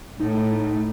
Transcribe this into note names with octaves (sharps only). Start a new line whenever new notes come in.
A2 D#4